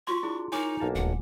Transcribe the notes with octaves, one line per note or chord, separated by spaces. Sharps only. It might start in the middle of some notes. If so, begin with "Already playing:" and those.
F4 F#4 C6 C#6
D4 E4 G#4
D#4 A#4 C#5 G#5 D6
B1 A#3 A5
D#1 D2 F#5